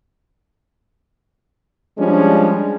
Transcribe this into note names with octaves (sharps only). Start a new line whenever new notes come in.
F3 G3 G#3 C#4 D4